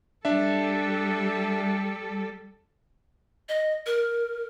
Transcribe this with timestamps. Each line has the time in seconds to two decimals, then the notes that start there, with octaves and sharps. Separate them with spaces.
0.25 G3 D4 A4 E5
3.49 D#5
3.86 A#4